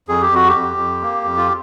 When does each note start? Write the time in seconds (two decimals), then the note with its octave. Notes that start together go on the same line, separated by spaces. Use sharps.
0.09 F2 G#4
0.21 G4
0.31 F2 F#4
0.48 G4
0.55 F2
0.77 F2
1.02 A#3
1.24 F2
1.37 F4